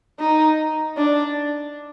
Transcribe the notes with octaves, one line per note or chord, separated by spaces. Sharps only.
D#4
D4